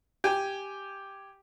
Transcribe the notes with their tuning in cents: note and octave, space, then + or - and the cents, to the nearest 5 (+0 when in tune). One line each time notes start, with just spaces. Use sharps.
G4 +0 G#5 +0